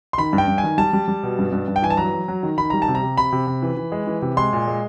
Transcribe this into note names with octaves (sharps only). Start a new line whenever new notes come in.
C6
D#3 B5
G2
G5
G2
G#5
D#3
G3 A5
G3
G3
B2
G2
G2
G2
G5
E3 G#5
A5
F#3 A#5
F#3
F#3
D#3
D#3 B5
G3 A#5
A5
C3
A#5
C3
C3 B5
C3
C3
E3
E3
G#3
E3
C3
G#3 C6
A#2
G#3